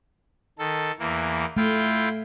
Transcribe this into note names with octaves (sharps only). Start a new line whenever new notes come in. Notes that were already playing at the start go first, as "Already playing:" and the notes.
D#3 A4
E2 E3 A#3
A3 E4 F4 G5